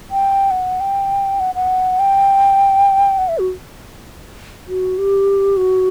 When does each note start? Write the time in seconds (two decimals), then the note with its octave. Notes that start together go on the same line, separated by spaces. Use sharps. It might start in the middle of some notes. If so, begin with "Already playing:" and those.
0.11 G5
0.51 F#5
0.80 G5
1.40 F#5
1.55 F#5
1.99 G5
3.18 F#5
3.28 E5
3.38 F#4
4.68 F#4
4.98 G4
5.57 F#4